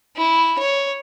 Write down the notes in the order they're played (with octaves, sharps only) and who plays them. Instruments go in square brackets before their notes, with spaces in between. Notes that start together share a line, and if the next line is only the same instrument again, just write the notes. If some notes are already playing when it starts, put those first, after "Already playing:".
[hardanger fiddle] E4
C#5